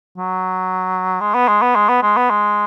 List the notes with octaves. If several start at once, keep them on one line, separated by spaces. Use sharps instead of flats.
F#3
G#3
B3
G#3
B3
G#3
B3
G#3
B3
G#3